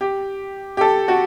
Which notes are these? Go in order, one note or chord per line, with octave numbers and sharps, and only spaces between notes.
G4
G4
A4
F#4